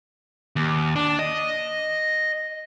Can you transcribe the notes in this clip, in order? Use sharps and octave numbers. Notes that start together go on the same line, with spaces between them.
D#2
D4
D#5